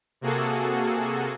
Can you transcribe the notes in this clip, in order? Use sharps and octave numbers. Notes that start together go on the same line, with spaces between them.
C3 A#3 F#4 G#4 A4